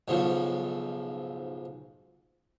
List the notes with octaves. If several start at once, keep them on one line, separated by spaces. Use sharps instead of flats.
B1 G#2 C#3 F3